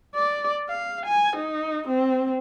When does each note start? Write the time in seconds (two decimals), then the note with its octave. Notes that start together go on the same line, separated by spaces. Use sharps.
0.15 D5
0.70 F5
1.06 G#5
1.36 D#4
1.88 C4